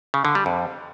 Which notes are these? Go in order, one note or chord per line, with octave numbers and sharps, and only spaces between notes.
C#3
D3
G3
F2